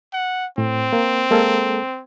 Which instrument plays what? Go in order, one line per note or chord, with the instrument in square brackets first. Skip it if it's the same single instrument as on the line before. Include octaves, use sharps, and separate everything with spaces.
[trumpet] F#5
[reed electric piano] A2 [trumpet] C4
[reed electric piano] A#3
G#3 A#3 A4